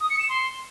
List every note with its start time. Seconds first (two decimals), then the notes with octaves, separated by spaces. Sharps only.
0.01 D#6
0.10 C#7
0.20 E7
0.29 C6